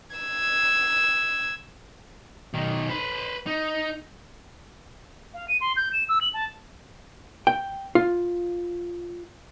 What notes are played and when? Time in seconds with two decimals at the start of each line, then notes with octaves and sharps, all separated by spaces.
0.16 E6 G#6
2.54 B1 D#3
2.89 B4 C5
3.47 D#4
5.34 F5
5.48 D#7
5.60 C6
5.76 G6
5.93 E7
6.08 E6
6.21 F#7
6.33 A5
7.47 G5
7.95 F4